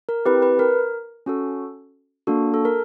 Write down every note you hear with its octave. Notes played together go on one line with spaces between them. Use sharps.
A#4
C4 E4 G4 B4
B4
A#4
C#4 F#4 A4
A#3 D4 F#4 A4
A4
A#4